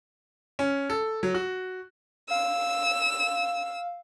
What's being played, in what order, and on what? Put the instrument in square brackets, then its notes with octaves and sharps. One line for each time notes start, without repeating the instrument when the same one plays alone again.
[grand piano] C#4
A4
F#3
F#4
[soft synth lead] F5 [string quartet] E6